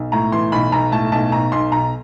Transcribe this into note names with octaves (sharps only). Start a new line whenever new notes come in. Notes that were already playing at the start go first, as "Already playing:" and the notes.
Already playing: B1
A2 A#5
E3 C6
B1 B5
B1 A#5
A2 A5
B1 A5
B1 A#5
B1 C6
B1 A#5